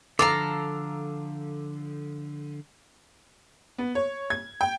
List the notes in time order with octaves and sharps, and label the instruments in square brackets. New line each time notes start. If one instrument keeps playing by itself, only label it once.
[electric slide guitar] D3 F3 [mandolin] A4 F5 A#5 [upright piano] D6
[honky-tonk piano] B3
C#5
G#6
G5